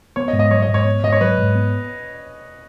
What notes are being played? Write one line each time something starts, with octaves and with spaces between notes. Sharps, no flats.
B3 C#5
D#5
G#2
D#5
F#3 C#5
D#5
G#2
C#5
B3
G#2 D#5
C#5
F#3 B4
G#2
B3